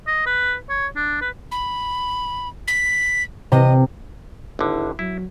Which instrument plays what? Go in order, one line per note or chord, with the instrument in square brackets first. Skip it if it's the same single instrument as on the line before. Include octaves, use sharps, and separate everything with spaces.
[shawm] D#5
B4
C#5
D4
B4
[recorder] B5
B6
[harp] C3 [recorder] D#5
[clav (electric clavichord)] G#1 D3 [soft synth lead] E4
[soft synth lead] F#3 [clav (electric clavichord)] E4